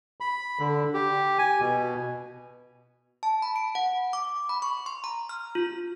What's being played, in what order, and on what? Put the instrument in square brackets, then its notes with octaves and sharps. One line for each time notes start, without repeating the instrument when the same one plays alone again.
[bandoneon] B5
D3
G4
G#5
B2
[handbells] A5
B5
D7
F#5
D6
B5
C#6
C6
A#5
F6
F4